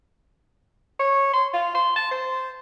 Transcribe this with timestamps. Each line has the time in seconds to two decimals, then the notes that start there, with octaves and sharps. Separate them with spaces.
0.99 C#5
1.34 C6
1.54 F4
1.75 C6
1.96 A5
2.11 C5